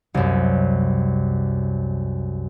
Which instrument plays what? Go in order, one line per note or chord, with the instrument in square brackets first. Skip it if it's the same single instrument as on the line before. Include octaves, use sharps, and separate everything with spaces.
[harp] C2 F#2